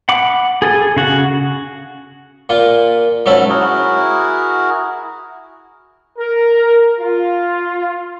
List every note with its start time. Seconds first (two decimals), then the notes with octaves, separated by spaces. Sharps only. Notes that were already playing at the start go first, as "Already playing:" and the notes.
0.09 F#5 B5 D6
0.62 G#4 A4 G#5
0.97 C#3 F#4 F#5
2.49 A#2 A#3 F4
3.26 G#2 F#3 C#4 E5 A5 B5
3.49 E4 F#4 G#4 A#4
6.18 A#4
6.99 F4